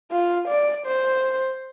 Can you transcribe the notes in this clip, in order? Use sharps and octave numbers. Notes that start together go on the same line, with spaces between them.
F4
D5
C5